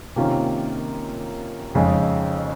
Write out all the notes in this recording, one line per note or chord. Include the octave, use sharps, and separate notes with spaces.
C3 D#3 A#3 C#4 F4
F2 C#3 G#3 D#4 G#4